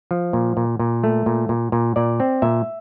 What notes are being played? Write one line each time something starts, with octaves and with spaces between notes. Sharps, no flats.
F3
A#2
A#2
A#2
A3
A#2
A#2
A#2
A#2 D5
C4
A#2 E5